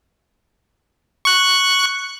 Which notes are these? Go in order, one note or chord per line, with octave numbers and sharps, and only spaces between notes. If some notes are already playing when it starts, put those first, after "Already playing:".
C#6 F#6